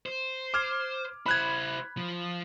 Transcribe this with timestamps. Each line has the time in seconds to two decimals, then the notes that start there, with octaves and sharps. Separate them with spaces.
0.06 C5
0.54 D6 F6 G#6
1.26 E4 C5 B5 F#6 G#6
1.97 F3